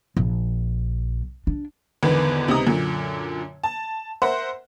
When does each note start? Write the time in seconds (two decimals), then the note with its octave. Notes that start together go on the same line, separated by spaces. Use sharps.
0.17 A#1
1.47 D4
2.03 G#1 E2 D3 D#3 B3 B4
2.48 C#2 C3 B3 D#4 A#5 D#6
2.67 F#2 A#2 D3
3.64 A5
4.22 A#4 C5 E5 F#5